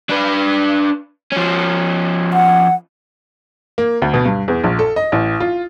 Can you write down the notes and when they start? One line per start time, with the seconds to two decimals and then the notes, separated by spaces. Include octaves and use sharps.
0.10 D4 B4
1.32 F3 C#4
2.33 F#5
3.78 A#3
4.02 D2
4.14 B2
4.25 G2
4.48 E2
4.64 A#1
4.79 A4
4.96 D#5
5.12 A1
5.40 F4